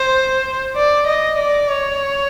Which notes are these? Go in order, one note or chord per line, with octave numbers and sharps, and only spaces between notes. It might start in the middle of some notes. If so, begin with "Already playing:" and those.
Already playing: C5
D5
D#5
D5
C#5